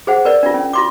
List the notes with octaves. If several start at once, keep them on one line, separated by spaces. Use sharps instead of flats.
G#4 C5 F#5
A#4 B4 D5
D4 F4
C#4
F4 C6 D6